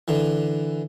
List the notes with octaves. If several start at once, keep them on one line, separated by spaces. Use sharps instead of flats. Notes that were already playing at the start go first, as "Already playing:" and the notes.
D3 E3